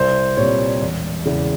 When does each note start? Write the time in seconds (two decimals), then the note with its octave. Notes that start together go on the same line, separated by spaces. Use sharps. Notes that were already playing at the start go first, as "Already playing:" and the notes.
Already playing: C2 C5
0.37 A#2 G3 C4 C#5
0.81 E1
1.25 E2 C#3